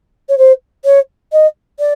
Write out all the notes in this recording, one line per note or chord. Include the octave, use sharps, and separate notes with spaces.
C#5
C5
C#5
D#5
D5